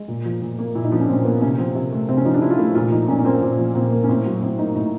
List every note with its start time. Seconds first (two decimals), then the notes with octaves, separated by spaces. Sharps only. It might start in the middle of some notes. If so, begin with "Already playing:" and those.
Already playing: G#3
0.08 A#2
0.26 F3
0.42 A#2
0.59 A#3
0.75 A#2 E4
0.84 D#4
0.91 F3 D4
1.00 C#4
1.08 A#2 C4
1.25 A#3 B3
1.42 C3 C#4
1.58 F3 C4
1.75 C3
1.92 A3
2.09 C3 C4
2.17 C#4
2.25 F3 D#4
2.34 D4
2.38 D#4
2.42 C3 E4
2.50 F4
2.59 A3 E4
2.75 A#2 F4
2.91 F3 D#4
3.08 A#2 C#4
3.19 C#4
3.25 A#3 C4
3.42 A#2 C4
3.58 F3
3.75 A#2 C4
3.92 A#3
4.04 C#4
4.09 A2 C4
4.25 F#3
4.42 A2 C4
4.59 A#3 D#4
4.75 A2 D#4